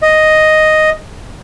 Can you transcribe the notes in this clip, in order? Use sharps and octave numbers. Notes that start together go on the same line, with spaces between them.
D#5